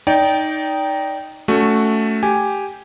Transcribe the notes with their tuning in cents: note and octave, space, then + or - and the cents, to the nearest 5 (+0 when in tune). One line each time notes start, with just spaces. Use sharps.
D#4 +0 D5 -25 G5 +0
A3 +0 C#4 +30 F#4 +0
G4 +0 G#5 +0